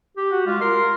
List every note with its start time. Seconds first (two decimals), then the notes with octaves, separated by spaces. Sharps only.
0.17 G4
0.32 F#4
0.47 G#3 F4
0.61 A#4 C6